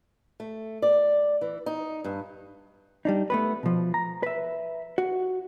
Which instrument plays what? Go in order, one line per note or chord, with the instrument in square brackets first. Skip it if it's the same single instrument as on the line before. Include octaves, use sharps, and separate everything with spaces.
[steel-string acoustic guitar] A3
D5
E3
D#4
G2
[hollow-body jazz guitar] G3 D4 D#4
A3 B3 B4
B2 F3
A#5
B4 E5
F#4